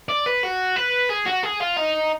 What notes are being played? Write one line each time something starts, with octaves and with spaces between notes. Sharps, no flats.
D5
B4
F#4
B4
G#4
F#4
G#4
F4
D#4